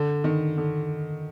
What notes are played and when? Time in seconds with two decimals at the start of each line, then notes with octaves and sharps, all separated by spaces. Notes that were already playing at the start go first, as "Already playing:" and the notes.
Already playing: D3
0.24 D#3
0.57 D3